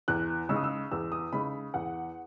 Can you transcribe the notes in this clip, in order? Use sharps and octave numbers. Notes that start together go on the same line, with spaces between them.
E2 F#6
C#3 G#3 D#4 E6
D#6
E6
E2 E6
D#6
C#3 G#3 D#4 B5
E2 F#5